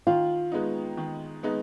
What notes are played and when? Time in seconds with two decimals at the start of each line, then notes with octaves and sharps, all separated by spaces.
0.07 D#3 F4
0.51 G#3 B3 D#4
0.97 D#3
1.43 G#3 B3 D#4